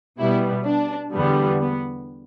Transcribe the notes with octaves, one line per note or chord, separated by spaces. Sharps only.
B2 G3 B3 E4
D4
E2 D3 G3 B3
B3